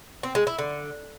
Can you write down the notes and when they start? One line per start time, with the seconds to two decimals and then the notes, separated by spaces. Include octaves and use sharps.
0.23 C4
0.35 G#3
0.47 E4
0.59 D3